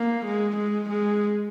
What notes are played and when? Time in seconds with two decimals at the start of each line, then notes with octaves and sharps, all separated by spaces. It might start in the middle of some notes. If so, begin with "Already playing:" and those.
Already playing: A#3
0.25 G#3
0.56 G#3
0.89 G#3